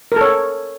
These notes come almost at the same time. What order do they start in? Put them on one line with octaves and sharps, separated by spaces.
A#4 A4 C#5